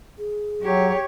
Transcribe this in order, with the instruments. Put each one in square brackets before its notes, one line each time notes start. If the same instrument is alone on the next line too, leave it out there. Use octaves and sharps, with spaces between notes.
[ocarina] G#4
[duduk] F#3 [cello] G4 C#5